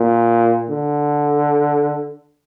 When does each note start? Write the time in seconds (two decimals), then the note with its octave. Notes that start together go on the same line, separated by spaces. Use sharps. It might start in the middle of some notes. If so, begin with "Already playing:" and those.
Already playing: A#2
0.70 D3